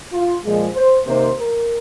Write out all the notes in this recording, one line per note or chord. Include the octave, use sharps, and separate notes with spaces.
F4
A#2 F3 G#3
C5
C3 D#3 A#3 C5
A#4